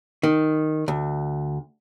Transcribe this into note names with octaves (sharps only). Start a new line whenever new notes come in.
D#3
D2